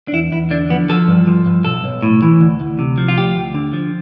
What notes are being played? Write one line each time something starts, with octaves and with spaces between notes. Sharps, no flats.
D4
E2 E4
E2 E4
D3 D4
F3 B3
F3 A4
G2
F3
G2
B1 A4
B1
A2
E3
D2
D2
C3
F3
F4
D2 G4
D2
D3
F3